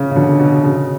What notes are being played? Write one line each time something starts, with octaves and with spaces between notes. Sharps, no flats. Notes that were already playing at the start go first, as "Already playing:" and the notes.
Already playing: C#3
C#3
B2 D3
B2
C#3